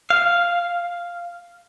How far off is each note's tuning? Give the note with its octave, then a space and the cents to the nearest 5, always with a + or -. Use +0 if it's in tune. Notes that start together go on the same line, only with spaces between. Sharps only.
F5 -5